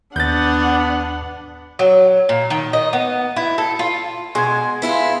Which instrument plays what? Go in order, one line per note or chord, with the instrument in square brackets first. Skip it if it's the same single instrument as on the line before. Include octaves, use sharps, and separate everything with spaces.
[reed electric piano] D#2 [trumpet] B3 [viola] D4 F#5 [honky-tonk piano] G6 A6
[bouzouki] F#3
A#2
D#3
D#5
B3
E4
A4
F4
[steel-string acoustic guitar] B2 [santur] G#3 G#5
[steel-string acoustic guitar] B3 E4 F4